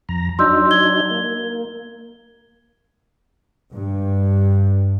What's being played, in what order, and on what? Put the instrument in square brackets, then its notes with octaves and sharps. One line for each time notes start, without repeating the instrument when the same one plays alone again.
[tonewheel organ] F2 A#5
[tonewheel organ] F#3 D4 D#4 [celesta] C6 E6 G6
[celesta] G#6 G7
[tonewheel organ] A#3
[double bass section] G2